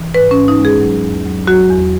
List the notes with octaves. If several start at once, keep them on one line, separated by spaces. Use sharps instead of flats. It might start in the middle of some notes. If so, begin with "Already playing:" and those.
Already playing: E3
G#2 B4
C#4
G#2
D#4
G#3
G#4
F#3
E2
F#3
F#3 F#4
E2